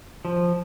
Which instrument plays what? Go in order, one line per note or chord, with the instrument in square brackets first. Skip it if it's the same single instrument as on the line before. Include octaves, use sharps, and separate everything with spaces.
[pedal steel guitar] F3